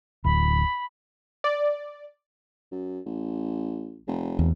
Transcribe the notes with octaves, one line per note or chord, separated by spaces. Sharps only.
D1 B5
D5
F#2
A1
F1
E2